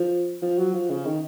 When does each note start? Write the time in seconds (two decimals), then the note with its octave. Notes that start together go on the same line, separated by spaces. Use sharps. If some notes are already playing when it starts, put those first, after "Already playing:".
Already playing: F3
0.42 F3
0.58 F#3
0.74 F3
0.90 C#3
1.06 D#3